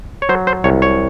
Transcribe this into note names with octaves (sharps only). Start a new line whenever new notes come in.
C#5
F#3 C5
C5
C2 C#5
C#5